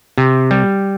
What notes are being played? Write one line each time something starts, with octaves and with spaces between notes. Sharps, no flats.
C3
G3